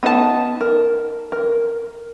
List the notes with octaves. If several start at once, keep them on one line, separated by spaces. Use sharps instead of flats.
B3 D#4 F#4 G#4 A5
A#4
A#4